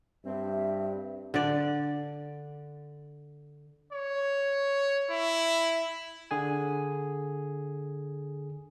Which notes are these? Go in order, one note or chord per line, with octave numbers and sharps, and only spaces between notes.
G2 C4 E5
D3 D5
C#5
E4
D3 G#4 G#5